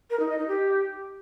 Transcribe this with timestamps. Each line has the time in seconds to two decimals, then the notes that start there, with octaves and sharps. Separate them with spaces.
0.10 A#4
0.20 D#4
0.29 D#5
0.38 D#4
0.48 G4